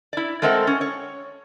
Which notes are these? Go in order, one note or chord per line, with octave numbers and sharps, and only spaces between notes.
E4 D5
G#3 A3 C4 A4 A#4 F#5
C#4
C#5